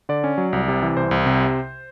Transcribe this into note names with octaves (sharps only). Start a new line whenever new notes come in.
D3 D5
C#4
F#3
C2
C3
E3
C2 C5
C2
C3